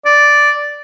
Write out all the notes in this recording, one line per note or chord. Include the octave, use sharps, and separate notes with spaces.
D5